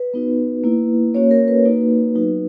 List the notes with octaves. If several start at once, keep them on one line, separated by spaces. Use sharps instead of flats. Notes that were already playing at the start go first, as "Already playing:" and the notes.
Already playing: B4
B3 D#4 F#4
A#3 E4
A#3 C#4 F#4 C#5
A#4
B4
A#3 D#4 F#4
F#3 B3 D#4 F#4